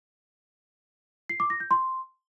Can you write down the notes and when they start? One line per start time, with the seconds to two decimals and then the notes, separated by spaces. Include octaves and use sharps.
1.29 C7
1.40 D6
1.50 A#6
1.60 G6
1.71 C6